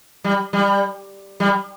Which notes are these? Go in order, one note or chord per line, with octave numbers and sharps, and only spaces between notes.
G3
G3
G3